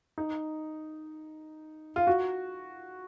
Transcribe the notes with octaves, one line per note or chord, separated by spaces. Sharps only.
D#4
F4
F#4